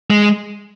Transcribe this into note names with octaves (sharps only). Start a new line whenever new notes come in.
G#3